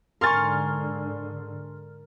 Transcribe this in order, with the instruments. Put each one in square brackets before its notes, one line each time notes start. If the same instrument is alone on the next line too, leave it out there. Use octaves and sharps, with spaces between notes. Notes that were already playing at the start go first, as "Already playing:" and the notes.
[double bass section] G#2 D3 [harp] A#4 G#5 C#6 [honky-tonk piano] C6 F6 A6